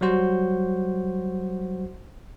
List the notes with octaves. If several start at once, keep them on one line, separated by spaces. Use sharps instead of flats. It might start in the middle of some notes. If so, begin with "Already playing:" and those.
F#3 G3 F#4 C5